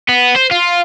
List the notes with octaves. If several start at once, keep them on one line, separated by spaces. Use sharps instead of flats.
B3
C5
F4